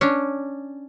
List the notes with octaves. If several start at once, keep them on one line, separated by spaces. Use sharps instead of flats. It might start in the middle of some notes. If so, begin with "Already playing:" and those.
C#4 D4